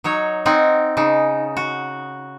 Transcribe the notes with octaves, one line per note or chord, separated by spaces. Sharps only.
F#3 D#4 C#5
C4 D#4 F#5 G#5
C#3 D#4
F#4